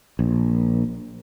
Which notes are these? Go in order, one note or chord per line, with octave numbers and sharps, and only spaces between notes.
A#1